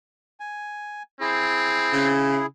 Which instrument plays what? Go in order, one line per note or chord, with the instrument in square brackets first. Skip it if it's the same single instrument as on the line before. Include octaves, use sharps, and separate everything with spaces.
[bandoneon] G#5
[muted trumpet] C4 [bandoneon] E4 G#4
[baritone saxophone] C#3